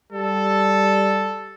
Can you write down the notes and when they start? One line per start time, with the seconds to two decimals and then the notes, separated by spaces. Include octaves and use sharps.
0.12 G3 A4